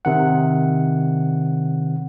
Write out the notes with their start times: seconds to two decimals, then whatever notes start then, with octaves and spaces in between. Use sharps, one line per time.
0.05 C3 D#3 F#5